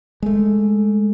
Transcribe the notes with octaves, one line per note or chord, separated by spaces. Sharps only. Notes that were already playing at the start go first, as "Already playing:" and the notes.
G#3 A3